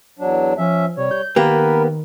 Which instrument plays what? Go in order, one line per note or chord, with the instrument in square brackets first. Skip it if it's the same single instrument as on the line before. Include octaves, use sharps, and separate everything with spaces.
[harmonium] E2 F#3 D4
[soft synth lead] F3 [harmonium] C#4 E5
[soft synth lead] C3 [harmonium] G3 C#5
[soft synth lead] G6
[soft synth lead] D#3 [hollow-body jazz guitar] A#3 B3 G4 [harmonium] A#4 B4